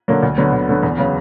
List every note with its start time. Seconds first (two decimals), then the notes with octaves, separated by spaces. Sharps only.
0.08 D3 F#3 A#3
0.23 D2
0.38 D3 F#3 B3
0.53 D2
0.69 D3 F#3 B3
0.83 E2
0.98 C#3 F#3 B3